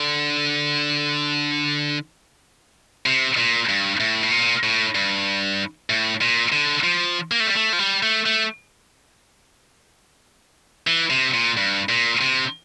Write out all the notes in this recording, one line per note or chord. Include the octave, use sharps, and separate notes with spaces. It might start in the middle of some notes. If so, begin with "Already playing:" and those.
Already playing: D3
C3
A#2
G2
A2
A2
A#2
A2
G2
A2
A#2
D3
F3
A#3
A3
G3
A3
F3
G3
A3
A3
E3
C3
A#2
G2
A#2
C3